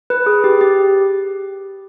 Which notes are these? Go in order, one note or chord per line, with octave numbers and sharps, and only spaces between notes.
B4
G#4
G4
G4